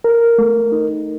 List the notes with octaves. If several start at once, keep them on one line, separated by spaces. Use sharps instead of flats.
A#4
A3
D#4